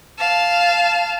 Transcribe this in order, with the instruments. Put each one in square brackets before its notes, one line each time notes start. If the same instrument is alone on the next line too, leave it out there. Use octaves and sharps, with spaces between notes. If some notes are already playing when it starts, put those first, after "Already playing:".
[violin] F5 A5